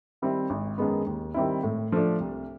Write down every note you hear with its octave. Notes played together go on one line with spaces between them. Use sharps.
D#3 G3 C4 E4
G#1
F#2 D#3 G#3 B3
D#2
D#3 G3 C4 E4
A2
F3 A3 D4
C2